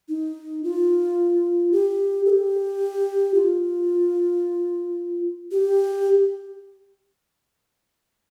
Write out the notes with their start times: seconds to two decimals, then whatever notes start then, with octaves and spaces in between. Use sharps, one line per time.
0.09 D#4
0.64 F4
1.72 G4
2.26 A4
2.30 G4
3.34 F4
5.51 G4